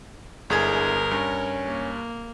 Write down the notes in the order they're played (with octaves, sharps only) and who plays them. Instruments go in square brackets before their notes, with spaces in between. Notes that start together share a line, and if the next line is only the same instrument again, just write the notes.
[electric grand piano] G1 G#4 G#6 [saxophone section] D3 G#3 E4 [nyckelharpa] A#4
[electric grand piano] G2 [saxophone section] C#4
[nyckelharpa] A#3